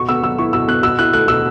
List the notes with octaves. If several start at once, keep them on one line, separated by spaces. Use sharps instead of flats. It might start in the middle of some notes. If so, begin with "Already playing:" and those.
Already playing: B2 C#6
B3 E6
F#3 E6
E4 C#6
B2 E6
B3 F#6
B2 E6
E4 F#6
A3 F#6
B2 E6